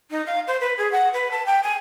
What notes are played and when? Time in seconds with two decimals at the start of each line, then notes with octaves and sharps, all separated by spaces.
0.10 D#4
0.25 F5
0.47 C5
0.60 B4
0.77 G#4
0.91 F#5
1.13 B4
1.31 A5
1.46 G5
1.63 G#5